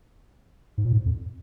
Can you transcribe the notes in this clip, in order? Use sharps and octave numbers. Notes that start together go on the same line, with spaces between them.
G#2
A#2
G#2
F2